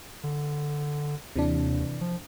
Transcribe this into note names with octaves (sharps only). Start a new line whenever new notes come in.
D3
D#2 C3 E3 D4
F3